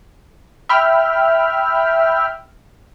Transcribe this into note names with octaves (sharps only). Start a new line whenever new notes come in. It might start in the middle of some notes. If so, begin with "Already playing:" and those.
E5 G5 B5 F6